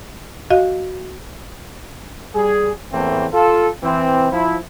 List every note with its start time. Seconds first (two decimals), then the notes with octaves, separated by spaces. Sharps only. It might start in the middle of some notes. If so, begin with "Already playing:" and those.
0.50 F#4 D#5 F5
2.34 G3 G#4
2.93 E2 A2 E3 A3 A#3 C4
3.33 F4 A4
3.83 E3 C4
4.32 F3 E4